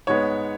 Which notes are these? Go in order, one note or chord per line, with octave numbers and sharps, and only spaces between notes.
G#2 G#3 B3 C#5